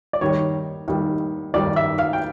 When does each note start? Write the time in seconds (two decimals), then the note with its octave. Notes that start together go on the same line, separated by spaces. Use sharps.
0.13 D5
0.21 D#2 D#3 G3 C#5
0.88 D#2 D#3 G3
1.54 D#2 D#3 G3 D5
1.76 E5
1.99 F5
2.13 G5